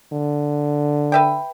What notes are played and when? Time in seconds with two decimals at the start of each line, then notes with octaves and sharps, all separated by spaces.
0.13 D3
1.12 B4 E5 G5